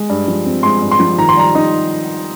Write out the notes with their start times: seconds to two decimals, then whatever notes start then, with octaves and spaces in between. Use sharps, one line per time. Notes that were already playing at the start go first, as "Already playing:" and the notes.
Already playing: G#3
0.10 G2
0.28 F3
0.45 C4
0.63 G#3 C6
0.82 G2
0.91 C6
1.00 F3
1.18 D#3 A#5
1.29 C6
1.37 G3 A#5
1.55 D#4